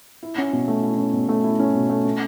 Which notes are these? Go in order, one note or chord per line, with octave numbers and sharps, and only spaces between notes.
E4
C#4
B2
A3
E4
C#4
B2
A3
E4
C#4
B2
A3
C#4